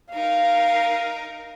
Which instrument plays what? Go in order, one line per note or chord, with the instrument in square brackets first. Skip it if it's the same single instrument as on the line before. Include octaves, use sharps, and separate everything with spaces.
[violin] D#4 A#4 [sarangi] F5